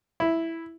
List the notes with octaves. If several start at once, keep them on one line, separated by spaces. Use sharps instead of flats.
E4